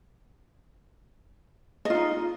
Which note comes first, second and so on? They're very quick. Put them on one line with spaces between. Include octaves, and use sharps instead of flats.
D#5 F4 D#4